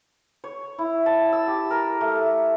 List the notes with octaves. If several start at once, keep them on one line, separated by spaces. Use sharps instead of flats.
C#5
E4
A5
E6
G4
A#4
A3